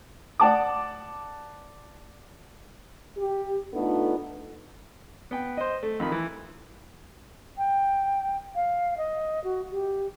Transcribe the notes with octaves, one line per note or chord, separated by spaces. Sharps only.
D5 F#5 A5 D6
G4
A3 B3 D4 D#4 F4 A4
B3 G5
C5 D#5
A3
F2 D#3 B5
E3
G5
F5
D#5
F#4
G4